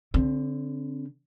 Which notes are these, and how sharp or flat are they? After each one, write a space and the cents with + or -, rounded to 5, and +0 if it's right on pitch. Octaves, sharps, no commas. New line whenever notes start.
D3 -25 C4 +5